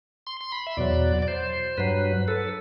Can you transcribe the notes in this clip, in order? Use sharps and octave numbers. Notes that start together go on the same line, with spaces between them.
C6
C6
B5
E5
E2 B2 F#3 D5
D5
C5
G2 F#3 B4
A4